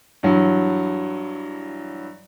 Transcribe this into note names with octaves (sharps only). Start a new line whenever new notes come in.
G2 E3 F#3